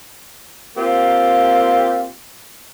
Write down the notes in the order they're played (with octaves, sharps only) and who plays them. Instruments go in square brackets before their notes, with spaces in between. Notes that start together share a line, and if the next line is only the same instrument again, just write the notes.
[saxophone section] A#3 C4 F4 G4